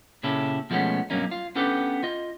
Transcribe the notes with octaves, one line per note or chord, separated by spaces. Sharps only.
A#2 C#3 C#4 E4 G4 A4
B2 F3 G#3 A3 B3 C#4
G2 B2 F#3 A#3 C#4 D#4
F4
B3 C#4 D4 G4 A4 B4
F4 D#5